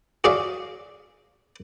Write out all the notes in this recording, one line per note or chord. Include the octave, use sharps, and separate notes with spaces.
F#4 G#4 C#5 D5 E5 F5